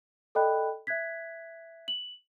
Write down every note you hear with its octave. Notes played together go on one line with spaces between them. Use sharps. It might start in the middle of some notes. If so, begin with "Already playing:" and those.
A4 D5 D#5 G5 B5 F#6
E5 F#6 G#6 B6
F#7